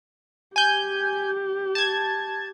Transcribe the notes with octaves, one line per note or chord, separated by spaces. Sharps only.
G4 G#5 G6
A5 G#6